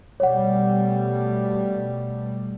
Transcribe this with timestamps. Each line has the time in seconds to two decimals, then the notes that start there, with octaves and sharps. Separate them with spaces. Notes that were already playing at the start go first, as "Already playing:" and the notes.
0.20 B2 G3 A3 C#5 F#5